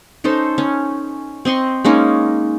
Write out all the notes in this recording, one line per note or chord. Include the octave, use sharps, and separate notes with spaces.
C#4 D#4 A4 C5
C#4
C4 D#5 C6 C#6
G#3 A#3 C#4 D#4